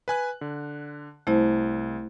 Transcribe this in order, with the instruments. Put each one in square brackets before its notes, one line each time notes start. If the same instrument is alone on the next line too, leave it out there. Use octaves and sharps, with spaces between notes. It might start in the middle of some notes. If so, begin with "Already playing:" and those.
[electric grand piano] B4 G#5 F#6
D3
[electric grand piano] C2 [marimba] A3 E4 C5